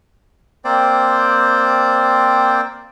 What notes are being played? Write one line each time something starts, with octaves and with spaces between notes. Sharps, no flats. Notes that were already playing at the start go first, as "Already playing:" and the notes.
A#3 C4 C5 D5 G5